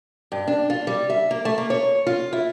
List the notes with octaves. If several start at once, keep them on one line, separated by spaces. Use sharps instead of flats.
G2
D4
F4
G3
E5
A#3
A3
A#3
C#5
F4
E4